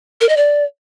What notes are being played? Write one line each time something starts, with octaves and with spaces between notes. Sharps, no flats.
A#4
D#5
D5